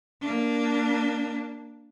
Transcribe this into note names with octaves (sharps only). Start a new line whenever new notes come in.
A#3 D4